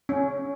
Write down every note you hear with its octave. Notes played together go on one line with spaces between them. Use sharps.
C#4